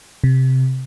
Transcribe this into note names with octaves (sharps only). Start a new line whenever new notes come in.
C3